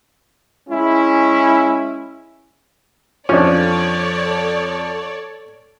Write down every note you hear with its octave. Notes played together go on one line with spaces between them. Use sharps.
G#3 C#4 E4
F2 F3 C#4 D4 A4 C#5 D5